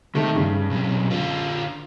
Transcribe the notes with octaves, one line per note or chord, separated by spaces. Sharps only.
C3 D#3 A3
G2 C#3
B1 C3
D3 F4